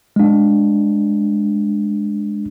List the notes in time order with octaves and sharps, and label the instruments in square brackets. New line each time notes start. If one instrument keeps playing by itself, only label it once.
[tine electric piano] G#3 D4